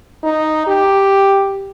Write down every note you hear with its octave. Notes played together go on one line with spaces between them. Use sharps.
D#4
G4